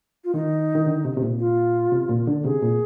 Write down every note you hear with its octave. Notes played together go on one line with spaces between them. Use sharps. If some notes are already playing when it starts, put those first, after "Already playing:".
F4
D#3 D#4
D#3
D3
C3
C3
A#2
F4
C3
A#2
D3
C3 G#4
A#2